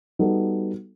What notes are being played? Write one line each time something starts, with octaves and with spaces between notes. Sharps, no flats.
G3 B3 D#4 F#4 A4